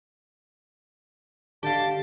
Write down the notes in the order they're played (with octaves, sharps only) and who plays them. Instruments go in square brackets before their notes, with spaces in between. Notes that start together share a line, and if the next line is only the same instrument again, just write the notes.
[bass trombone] D3 [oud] G4 F5 [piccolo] A5